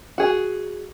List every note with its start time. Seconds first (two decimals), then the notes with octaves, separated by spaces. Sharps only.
0.18 F#4 G#4